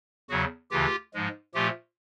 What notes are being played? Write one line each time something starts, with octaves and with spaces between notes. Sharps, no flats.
E2 C#3 F#3 F#4 G#4
D2 C#3 E3 F4 G4
G#2 F3 G#3
A#2 F3 A3 F4 G4